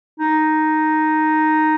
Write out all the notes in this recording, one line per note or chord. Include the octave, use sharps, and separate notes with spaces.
D#4